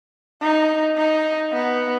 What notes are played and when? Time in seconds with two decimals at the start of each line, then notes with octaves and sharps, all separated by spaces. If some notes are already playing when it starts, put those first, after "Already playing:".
0.42 D#4
0.97 D#4
1.53 B3